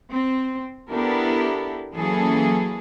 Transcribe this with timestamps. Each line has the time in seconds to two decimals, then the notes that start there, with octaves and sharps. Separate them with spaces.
0.10 C4
0.89 B3 D4 E4 G4 A4 A#4
1.96 E3 F#3 A#3 C#4 G#4 A4